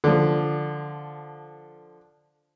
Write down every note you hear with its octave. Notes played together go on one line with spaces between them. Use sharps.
D3 F3